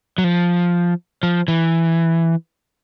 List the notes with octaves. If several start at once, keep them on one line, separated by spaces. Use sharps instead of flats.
F#3
F3
F3
E3